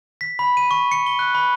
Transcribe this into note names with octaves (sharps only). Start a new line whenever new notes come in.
B6
B5
D#7
C#6
C#7
G7
F#6
B5